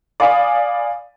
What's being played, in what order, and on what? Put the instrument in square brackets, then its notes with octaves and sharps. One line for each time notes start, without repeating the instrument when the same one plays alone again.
[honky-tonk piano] D5 F5 G#5 B5 D#6